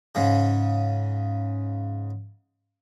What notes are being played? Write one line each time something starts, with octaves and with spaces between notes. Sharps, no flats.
G#2 C#3